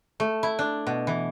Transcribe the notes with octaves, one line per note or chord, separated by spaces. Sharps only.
A3
E4
D4
B2
E3